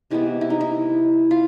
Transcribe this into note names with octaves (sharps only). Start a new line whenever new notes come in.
C3 E3 G#3 B3 E4
E4
D#4
E4
F4